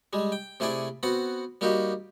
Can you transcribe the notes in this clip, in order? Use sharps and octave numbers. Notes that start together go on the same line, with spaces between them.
G3 G#3
G5
C3 A3 E4 G#4 D5
B3 C4 F#4 F#5
G3 A#3 D#4 F#4 G4